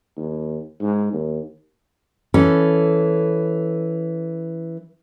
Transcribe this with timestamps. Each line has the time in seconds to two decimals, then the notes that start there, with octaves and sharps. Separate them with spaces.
0.17 D#2
0.81 G#2
1.13 D#2
2.34 E3 C#4 A4